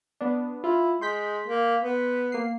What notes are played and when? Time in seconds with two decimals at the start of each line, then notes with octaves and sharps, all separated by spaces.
0.21 B3 D4
0.64 E4 F4
1.01 G#3 C6 G6 B6
1.46 A#3
1.82 B3
2.32 A#3 C7